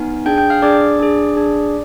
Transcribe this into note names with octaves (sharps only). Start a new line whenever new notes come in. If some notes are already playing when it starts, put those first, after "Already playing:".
Already playing: B3 D#4 G#5
D4 G#4 G5 G6
G5 G6
F5 F6
D4 G#4 D5 D6
D4 G#4
D4 G#4